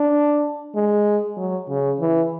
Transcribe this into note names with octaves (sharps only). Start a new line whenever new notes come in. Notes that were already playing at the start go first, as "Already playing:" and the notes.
Already playing: D4
G#3
F#3
C#3
E3